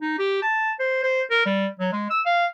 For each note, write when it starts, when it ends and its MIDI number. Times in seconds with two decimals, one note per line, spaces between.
0.02 0.16 63
0.19 0.41 67
0.42 0.72 81
0.80 1.02 72
1.03 1.22 72
1.31 1.42 70
1.46 1.67 55
1.80 1.91 54
1.93 2.08 56
2.10 2.21 88
2.26 2.47 77